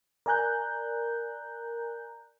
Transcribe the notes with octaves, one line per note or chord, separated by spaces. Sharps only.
A#4 D5 G#5 A#5 F#6 G6